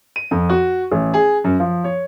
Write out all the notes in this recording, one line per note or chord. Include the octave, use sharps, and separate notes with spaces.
D#7
F2
F#4
A1
G#4
F#2
F3
C#5